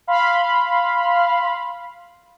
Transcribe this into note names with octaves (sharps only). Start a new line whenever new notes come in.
F5 B5 C6